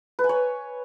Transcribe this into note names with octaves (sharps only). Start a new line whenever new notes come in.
B4
G#5
C#5